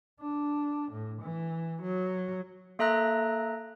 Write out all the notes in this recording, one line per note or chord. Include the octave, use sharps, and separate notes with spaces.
D4
A2
E3
F#3
A#3 A4 E5 A#5 F#6 A#6